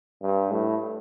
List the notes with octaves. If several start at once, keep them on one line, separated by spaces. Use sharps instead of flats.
G2
A2